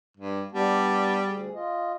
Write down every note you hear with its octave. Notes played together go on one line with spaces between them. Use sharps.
G2
G3 B3 D4
D2 G#4
F4 D#5